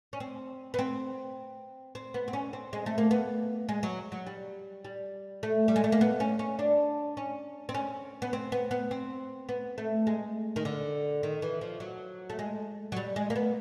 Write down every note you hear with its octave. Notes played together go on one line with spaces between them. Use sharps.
C#4
C4
B3
C4
C4
B3
C4
C#4
C4
G#3
A3
A#3
B3
G#3
F#3
F#3
G3
G3
A3
G3
G#3
A3
A#3
B3
C#4
C#4
D4
C#4
C4
C#4
B3
C4
B3
B3
C4
B3
A3
G#3
D#3
D3
D#3
E3
F3
F#3
A3
G#3
F#3
G3
G#3
A#3
B3